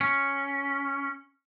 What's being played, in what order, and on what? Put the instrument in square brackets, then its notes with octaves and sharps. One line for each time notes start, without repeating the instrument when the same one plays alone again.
[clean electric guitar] C#4